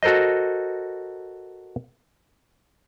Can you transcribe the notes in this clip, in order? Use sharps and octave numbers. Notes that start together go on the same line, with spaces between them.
F#4 A4 A#4 C5 D#5